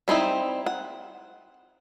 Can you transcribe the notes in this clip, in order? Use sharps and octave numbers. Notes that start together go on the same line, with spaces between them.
G3 C4 D#4 E4
F#5